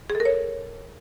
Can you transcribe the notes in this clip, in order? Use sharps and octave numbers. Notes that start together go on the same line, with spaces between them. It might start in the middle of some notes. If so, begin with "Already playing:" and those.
G#4
A4
A#4
C#5